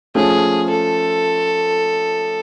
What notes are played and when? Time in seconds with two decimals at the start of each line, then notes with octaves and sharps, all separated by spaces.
0.15 F3 A3 C#4 G#4
0.70 A4